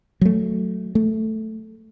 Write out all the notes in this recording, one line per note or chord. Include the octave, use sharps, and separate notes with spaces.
F#3 A3
A3